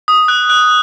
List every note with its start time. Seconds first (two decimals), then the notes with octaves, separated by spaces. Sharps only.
0.08 D#6
0.28 F#6
0.50 F#6